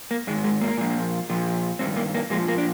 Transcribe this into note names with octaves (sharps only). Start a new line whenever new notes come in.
A#3
G#2 D#3 G#3
G#3
A#3
A#2 F3
A#2 F3
G2 D#3 C4
A#3
A#3
A#2 F3 G#3
A#3
D4